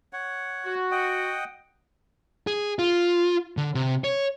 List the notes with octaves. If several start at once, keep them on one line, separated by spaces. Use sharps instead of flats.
C#5 F#5
F#4
D#5 F#5 G5
G#4
F4
D3
C3
C#5